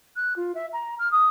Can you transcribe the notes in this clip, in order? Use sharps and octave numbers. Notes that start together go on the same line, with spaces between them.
F#6
F4
E5
A#5
F6
D#6